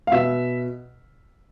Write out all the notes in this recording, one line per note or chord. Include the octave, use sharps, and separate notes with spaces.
F5
B2 E5